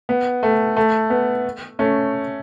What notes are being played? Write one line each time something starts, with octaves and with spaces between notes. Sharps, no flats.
B3
A3
A3
B3
A3 C#4